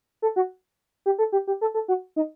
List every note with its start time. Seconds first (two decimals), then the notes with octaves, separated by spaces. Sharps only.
0.22 A4
0.36 F#4
1.06 G4
1.19 A4
1.32 G4
1.47 G4
1.61 A4
1.74 A4
1.88 F#4
2.16 D#4